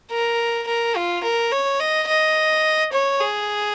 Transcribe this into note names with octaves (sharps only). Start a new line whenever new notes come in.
A#4
A#4
F4
A#4
C#5
D#5
D#5
C#5
G#4